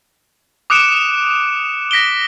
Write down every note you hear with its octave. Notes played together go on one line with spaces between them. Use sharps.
D6 D#6 F#6 C#7 D7 E7
A#6 B6 D7 G7